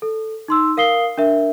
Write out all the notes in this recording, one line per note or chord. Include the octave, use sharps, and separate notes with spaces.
A4
D#4 C6 E6
A#4 F5 D#6 C7 G7
D4 A#4 E5